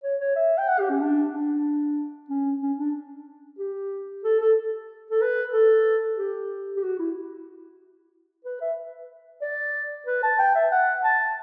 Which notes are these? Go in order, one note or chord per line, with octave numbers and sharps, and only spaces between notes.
C#5
C#5
E5
G5
F#5
G4
C#4
D4
D4
C#4
C#4
D4
G4
A4
A4
A4
B4
A4
G4
G4
F#4
E4
B4
E5
D5
B4
A5
G5
E5
F#5
A5